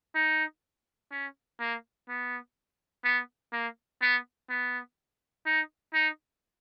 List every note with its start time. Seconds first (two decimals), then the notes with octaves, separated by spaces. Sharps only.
0.15 D#4
1.11 C#4
1.60 A#3
2.09 B3
3.04 B3
3.53 A#3
4.02 B3
4.50 B3
5.46 D#4
5.94 D#4